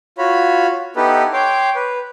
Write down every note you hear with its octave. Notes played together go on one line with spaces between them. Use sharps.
F4 F#4 C#5 B5
B3 D#4 E4 G4 A4 B4
C#5 G5 C6 D6
B4